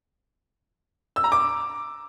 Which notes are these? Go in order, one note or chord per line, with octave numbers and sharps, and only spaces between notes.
E6
A#5
D6